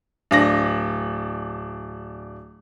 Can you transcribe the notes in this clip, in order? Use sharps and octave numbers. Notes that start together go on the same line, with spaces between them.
D1 D4 A#6